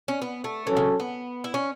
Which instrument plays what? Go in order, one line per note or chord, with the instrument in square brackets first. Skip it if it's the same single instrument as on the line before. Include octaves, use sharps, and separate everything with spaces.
[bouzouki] C#4
B3
A3
[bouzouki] E3 [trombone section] F#3 C#4 A4
[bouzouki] C#3
B3
E4
C#4